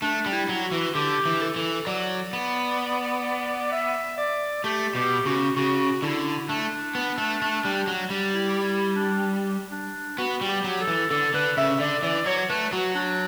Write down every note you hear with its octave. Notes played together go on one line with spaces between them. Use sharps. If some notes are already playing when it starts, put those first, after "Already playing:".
A3 D4
G3
E4
F#3 E4
F#4
E3
D3 G4
E3
A4
E3
F#3 D5
B3
E5
D5
A3 G4
B2 G4
C#3 F#4
C#3 F#4
D3 E4
A3 D4
B3
A3
A3
G3
F#3
G3
E4
E4
D4
D4
B3 F#4
G3
G4
F#3
A4
E3
D3 A4
D3 B4
C#3 E5
D3 D5
E3 D5
F#3 C#5
C#5
A3 B4
F#3 F#4
D4